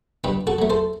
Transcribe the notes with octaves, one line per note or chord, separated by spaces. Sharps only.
G2 G4 B4
F#4 A4
F#3 A3
A4 C5